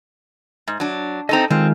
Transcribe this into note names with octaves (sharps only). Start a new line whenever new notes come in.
G#2
F#3 D4
C4 D#4 A4 D#5 A#5
D#3 G#3 C4 F4